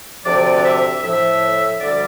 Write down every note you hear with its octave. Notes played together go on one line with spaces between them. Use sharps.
D2 C3 F3 D5
D5
E5
A2 F3 E5
D2 D3 G3 D5